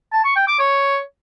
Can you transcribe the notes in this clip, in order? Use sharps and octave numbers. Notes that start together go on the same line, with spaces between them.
A5
C#6
G5
D6
C#5